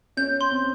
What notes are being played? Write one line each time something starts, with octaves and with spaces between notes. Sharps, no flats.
C#4 G6
C6
C4